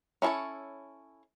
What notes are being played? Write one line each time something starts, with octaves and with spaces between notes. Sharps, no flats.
C#4 E4 G#4 A4 C#5